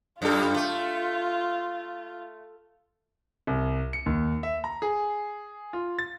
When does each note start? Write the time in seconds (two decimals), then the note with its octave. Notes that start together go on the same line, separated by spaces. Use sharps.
0.22 F#2 G3 F4 A4
0.56 A3
3.47 C2
3.93 C#7
4.06 D#2
4.43 E5
4.64 A#5
4.82 G#4
5.73 F4
5.99 A6